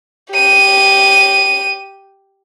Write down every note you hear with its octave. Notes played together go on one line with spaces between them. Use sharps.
G4 D#7